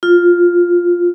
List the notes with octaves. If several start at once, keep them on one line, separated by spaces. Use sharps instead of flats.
F4